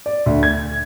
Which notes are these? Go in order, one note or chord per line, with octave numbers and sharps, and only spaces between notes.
D5
D2
G#6